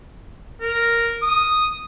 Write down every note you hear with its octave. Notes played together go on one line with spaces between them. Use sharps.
A#4
D#6